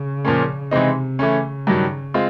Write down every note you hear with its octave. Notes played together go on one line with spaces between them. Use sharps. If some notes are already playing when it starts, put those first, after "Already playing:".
Already playing: C#3
A#2 F3 A#3 C#4
C3 E3 G#3 C4 D#4
C#3 E3 A3 C#4
G2 D#3 F#3
G#3 C4 F4